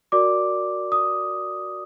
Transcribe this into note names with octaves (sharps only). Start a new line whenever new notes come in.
F#4 A#4 D5 D6
D#6